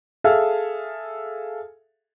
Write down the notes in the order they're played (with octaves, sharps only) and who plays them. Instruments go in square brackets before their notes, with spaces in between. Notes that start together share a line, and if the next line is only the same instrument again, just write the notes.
[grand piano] G#4 A4 E5 F5 F6